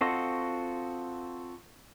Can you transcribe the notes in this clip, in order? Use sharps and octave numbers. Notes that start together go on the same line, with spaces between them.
C4 F4 F#4 A4 D#5